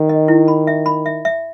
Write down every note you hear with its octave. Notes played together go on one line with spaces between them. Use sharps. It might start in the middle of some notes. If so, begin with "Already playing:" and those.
Already playing: D#3
D#5
E4
B5
E5
B5
E5
E5